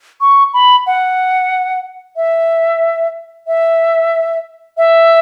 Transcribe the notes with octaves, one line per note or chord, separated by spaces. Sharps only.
C#6
B5
F#5
E5
E5
E5